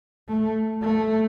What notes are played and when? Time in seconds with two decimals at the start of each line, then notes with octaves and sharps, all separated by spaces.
0.28 A3
0.82 A3